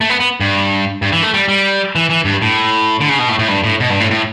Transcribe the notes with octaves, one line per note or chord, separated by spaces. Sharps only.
A3
B3
B3
G2
G2
E3
A3
G3
G3
E3
E3
G2
A2
D3
C#3
B2
A2
A2
G2
A2
B2
G2
A2
A2